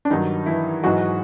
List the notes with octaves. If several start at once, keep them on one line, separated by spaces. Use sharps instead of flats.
D4
G2 D#3 F#3 D#4
E3 E4
G#2 E3 F#3 G#3 F#4